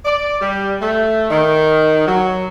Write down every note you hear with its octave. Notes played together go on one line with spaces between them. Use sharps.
D5
G3
A3
D#3
F#3